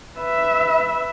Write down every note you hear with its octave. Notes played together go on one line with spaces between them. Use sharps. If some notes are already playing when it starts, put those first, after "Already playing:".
B4 E5